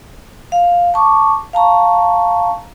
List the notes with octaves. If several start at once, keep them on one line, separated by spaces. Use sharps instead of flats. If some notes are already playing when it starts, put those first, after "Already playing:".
F5
A5 C#6 D6
F5 A5 A#5 C#6